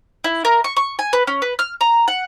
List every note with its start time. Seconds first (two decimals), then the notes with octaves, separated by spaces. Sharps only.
0.24 E4
0.45 A#4
0.64 C#6
0.77 C#6
0.99 G#5
1.13 B4
1.27 C#4
1.42 B4
1.59 F6
1.81 A#5
2.08 F#5